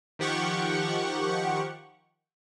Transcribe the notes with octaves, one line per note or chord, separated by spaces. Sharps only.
D#3 F3 G4 F#5 C#6